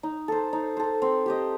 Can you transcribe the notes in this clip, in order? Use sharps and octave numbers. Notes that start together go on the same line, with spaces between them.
D#4
A4 C5
D#4
A4 C5
C4
G4 C5 D#5